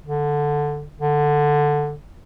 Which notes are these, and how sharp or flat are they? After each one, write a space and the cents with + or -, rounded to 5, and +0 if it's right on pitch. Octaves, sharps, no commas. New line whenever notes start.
D3 +0
D3 +5